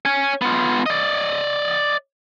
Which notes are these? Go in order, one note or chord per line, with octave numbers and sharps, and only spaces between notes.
C#5 G#5
B3 F4
D5 D#5